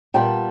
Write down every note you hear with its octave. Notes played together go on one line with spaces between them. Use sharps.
A#2 G3 B3 G5 A5